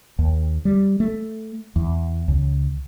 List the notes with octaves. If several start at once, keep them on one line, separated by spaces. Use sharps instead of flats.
D#2
G3
A3
E2
C#2